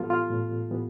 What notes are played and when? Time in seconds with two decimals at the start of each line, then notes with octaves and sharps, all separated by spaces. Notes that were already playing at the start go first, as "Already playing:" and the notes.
Already playing: A2 E3 G3 B3 F4 A4
0.10 F4
0.31 A2
0.71 E3 G3 B3